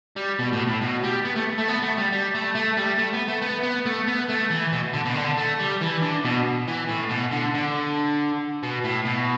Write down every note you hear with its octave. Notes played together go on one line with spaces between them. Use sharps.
G3
B2
A2
A2
B2
G3
B3
A3
A3
B3
A3
G3
G3
A3
A3
G3
A3
B3
A3
B3
B3
A3
B3
A3
E3
B2
D3
B2
D3
A3
G3
E3
D3
B2
E3
A2
B2
D3
D3
B2
A2
B2